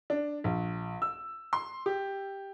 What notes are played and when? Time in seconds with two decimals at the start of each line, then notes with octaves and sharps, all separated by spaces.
0.10 D4
0.44 A#1
1.02 E6
1.53 C6
1.86 G4